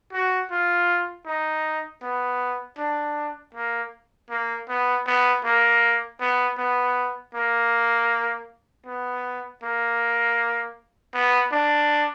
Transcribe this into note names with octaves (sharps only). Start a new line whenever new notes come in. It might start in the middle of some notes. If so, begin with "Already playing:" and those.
F#4
F4
D#4
B3
D4
A#3
A#3
B3
B3
A#3
B3
B3
A#3
B3
A#3
B3
D4